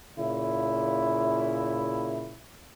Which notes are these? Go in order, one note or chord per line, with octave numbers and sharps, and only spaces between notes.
A#2 C#3 E4